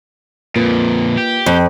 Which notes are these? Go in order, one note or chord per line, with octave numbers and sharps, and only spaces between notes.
F2 A#2 A#3 F4 B4
G4
F2 C5